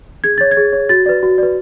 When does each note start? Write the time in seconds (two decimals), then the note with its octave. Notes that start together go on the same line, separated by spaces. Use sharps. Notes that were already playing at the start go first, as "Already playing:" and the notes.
0.24 G#4 G#6
0.38 C#5 A6
0.51 G#6
0.57 G#4
0.73 C#5
0.89 F#4 A6
1.06 B4 D5
1.23 F#4
1.38 B4 D5